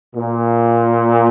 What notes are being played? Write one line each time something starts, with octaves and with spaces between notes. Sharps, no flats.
A#2